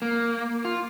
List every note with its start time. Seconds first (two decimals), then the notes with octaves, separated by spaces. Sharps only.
0.02 A#3
0.65 F4